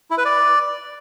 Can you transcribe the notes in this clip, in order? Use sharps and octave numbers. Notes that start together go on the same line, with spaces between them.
E4
B4
D5